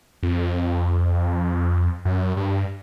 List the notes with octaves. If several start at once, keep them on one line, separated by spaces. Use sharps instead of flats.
F2
F#2
G2